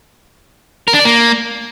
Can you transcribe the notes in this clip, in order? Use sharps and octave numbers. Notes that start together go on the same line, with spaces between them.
A#4
D4
D5
A#3